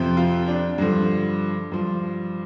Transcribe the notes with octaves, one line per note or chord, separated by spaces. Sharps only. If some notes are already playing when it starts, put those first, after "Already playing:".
Already playing: F2 C3 F3
F4
D4
G2 D3 F3
G2 F3